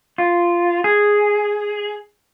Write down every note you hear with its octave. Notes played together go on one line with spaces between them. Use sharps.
F4
G#4